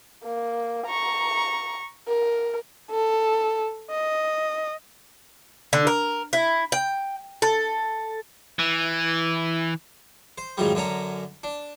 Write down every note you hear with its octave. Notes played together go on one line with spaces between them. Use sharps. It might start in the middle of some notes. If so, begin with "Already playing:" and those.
A#3
A#5 C#6
A#4
A4
D#5
D3
A#4
E4
G5
A4
E3
C5
F2 G#2 D#3 F#3 G3
F#2 D3 C#4 A#5
D4